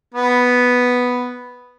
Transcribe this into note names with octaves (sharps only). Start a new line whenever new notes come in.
B3